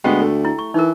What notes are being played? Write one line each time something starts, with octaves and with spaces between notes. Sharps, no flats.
D2 G#3 B3 G4 G5
A3
E4
C#6
E3 D#4 A#4